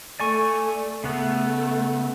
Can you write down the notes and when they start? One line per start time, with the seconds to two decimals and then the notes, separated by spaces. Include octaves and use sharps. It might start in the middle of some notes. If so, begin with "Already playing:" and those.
0.20 A3 D5 G#5 C#6
1.04 C#3 A3 B3